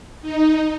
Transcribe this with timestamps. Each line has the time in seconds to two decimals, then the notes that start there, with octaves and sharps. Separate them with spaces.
0.22 D#4